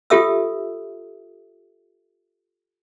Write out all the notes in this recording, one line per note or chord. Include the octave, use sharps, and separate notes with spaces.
F4 G4 A4 E5 D#6 E6